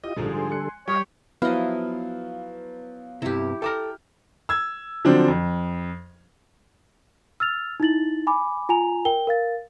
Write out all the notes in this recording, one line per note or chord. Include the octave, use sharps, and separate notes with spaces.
E4 F4 G4 D#5 D#7
A#1 G#2 D3 F3 G3 G#3 D4 A4
G#5 C6
F#6 C#7
G3 G4 C#5 D#5 F5 G5
F3 F#3 B3 E4 B4 D#5 F5
G2 C3 E4 G4
A4 G5 A5 A#5 D6 F6
E6 G#6
D3 F3 F#3 C4 D4
F2
E6 F6 A6 F7
D#4 E4 A6 F#7
G#5 B5 D6
F4 G#5 A#5 F7
A#4 G5 G7
A#4 F5 A6